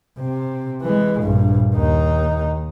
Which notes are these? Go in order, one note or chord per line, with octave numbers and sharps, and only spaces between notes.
C3
E3 G#3
A#1 G2
D#2 D#4